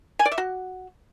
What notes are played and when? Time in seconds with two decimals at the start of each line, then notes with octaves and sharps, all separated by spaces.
0.19 G#5
0.25 D5
0.32 E5
0.38 F#4